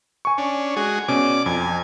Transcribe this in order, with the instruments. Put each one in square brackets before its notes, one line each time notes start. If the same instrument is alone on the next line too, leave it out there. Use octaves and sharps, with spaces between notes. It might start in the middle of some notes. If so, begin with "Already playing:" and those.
[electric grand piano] G#5 C#6
[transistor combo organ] C#4 D4
G#3 F#4 G#4
[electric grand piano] B2 C#4 [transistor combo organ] D5 D6
[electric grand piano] F2 [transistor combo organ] G#5